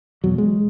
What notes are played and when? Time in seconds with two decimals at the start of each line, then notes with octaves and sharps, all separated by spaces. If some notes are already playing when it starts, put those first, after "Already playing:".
0.24 E1 E2 B2 F#3
0.38 G#3